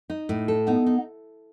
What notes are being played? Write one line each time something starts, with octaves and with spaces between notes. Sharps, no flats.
D#4
A2
A4
B3 D#4
D#4